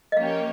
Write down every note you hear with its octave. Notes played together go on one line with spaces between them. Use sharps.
D#5
F3 A#3 C#4 G4 C#5 F5